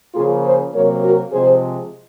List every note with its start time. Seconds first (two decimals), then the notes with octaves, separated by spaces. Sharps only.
0.14 C#3 F3 A#3 F4 G#4
0.44 G#4 C5
0.73 C3 F#3 A#3 A#4 C#5
1.03 F#4 A#4
1.32 C3 F3 G#3 G#4 C5